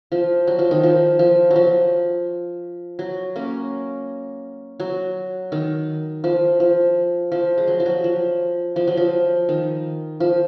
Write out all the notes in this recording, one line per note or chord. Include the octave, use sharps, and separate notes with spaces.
F3
F#3
F3
D#3
F3
F3
F#3
F3
F#3
A#3 C#4
F#3
D#3
F3
F3
F3
G#3
F#3
F3
F#3
F3
F3
F#3
F3
D#3
F3